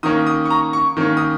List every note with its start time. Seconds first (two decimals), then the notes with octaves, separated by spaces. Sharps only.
0.03 D#3 A#3 C#4 D#6
0.27 D#6
0.45 C#6
0.50 A#5
0.73 C#6
0.97 D#3 A#3 C#4
1.17 D#6